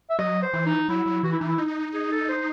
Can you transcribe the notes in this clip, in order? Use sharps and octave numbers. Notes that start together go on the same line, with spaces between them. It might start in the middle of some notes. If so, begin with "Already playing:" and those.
E5
F#3 D#5
C5
E3
D#4
F#3 E4
F#3
E3 F#4
E4
E3 D#4
E4
D#4
G#4
A4
C5